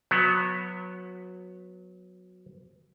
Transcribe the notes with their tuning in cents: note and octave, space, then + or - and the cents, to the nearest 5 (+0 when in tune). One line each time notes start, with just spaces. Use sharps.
F#3 -20 B3 +0